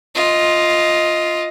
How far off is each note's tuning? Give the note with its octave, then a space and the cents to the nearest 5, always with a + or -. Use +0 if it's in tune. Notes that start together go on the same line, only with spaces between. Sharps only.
F4 +0 D#5 +10